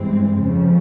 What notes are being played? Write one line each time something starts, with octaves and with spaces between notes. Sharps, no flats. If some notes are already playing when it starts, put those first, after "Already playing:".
Already playing: G2 E3 G#3 C4
F2 C#3 F3